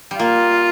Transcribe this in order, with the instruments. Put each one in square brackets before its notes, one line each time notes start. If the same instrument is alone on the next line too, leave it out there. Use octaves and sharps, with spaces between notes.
[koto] G3
[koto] A#3 [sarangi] F4